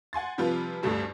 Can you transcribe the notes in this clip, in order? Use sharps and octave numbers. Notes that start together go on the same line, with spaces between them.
F#5 G#5 C6 A6
C3 F3 G3 F4 B4
A1 D2 G2 G3 A3